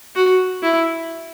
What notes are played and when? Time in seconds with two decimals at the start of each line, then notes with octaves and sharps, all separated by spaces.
0.16 F#4
0.63 E4